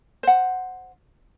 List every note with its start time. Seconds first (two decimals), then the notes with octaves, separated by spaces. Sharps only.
0.23 C5 F#5